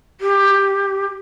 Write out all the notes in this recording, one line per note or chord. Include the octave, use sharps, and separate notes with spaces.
G4